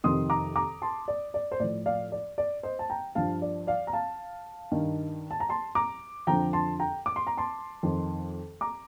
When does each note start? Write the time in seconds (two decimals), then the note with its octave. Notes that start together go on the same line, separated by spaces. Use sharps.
0.04 F2 C3 D#3 C6 D#6
0.30 A#5 D6
0.56 A#5 D6
0.82 A5 C6
1.08 D5
1.34 D5
1.52 C5
1.60 A2 F3 D5
1.86 D5 F5
2.12 D5
2.38 D5
2.63 C5 D#5
2.79 A5
2.90 G5 A#5
3.15 G2 F3 F5 A5
3.42 D5
3.67 D5 F5
3.87 A#5
3.93 F5 A5
4.72 G2 D#3
5.31 A5
5.40 A#5
5.49 A5 C6
5.75 A#5 D6
6.27 F2 D3 F3 G5 A#5
6.53 A5 C6
6.80 G5 A#5
7.06 D6
7.16 C6
7.27 A#5
7.37 A5 C6
7.83 F2 D#3
8.61 A#5 D6